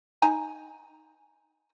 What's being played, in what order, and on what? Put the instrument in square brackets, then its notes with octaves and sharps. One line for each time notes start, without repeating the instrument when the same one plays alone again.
[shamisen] D#4 G#5 A#5